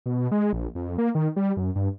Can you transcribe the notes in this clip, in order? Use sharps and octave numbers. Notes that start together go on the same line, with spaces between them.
B2
G#3
A#1
F2
A#3
D#3
G3
F#2
G2